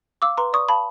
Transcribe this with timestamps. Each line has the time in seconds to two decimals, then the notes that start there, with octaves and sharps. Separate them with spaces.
0.22 F5 D6 E6
0.37 B4 A#5 C6
0.53 D5 C#6 D#6
0.69 F5 A5 B5